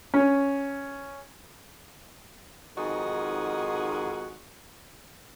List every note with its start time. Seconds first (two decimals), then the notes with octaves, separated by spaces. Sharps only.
0.14 C#4
2.77 F2 G#2 D#3 F#4 G#4 D#5